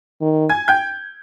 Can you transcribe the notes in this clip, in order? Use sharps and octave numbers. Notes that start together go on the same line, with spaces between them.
D#3
G#5 G#6
G5 G6